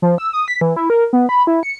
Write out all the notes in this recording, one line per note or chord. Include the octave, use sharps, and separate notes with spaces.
F3
E6
D#6
B6
E3
E4
A#4
B3
B5
E4
C#7